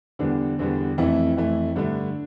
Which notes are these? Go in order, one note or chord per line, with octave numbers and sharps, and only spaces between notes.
E2 D3 G3 B3 D4
E2 D3 G3 B3
F2 E3 A3 E4
F2 E3 A3
G2 D3 A3 D4